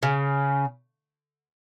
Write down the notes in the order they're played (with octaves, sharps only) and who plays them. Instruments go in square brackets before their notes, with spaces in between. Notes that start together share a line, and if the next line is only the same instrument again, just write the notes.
[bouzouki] C#3